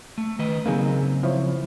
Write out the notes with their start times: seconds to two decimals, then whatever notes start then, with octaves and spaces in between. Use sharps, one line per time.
0.18 A3
0.39 D#3 B4 D#5
0.66 C#3 F#3 A#3 C4 D#4 G#4
1.23 F3 E4 C#5